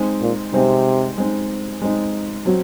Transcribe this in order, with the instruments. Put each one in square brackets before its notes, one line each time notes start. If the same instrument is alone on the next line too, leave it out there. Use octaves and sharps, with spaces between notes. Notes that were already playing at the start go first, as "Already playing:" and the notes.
Already playing: [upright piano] G#3 C4 D#4
[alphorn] A#2
[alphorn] C3 [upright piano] G#3 C4 D#4
[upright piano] G#3 C4 D#4
G#3 C4 D#4
F#3 C4 F#4